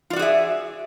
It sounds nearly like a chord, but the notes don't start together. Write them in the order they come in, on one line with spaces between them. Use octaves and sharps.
F4 D5 F#4 G#4 E5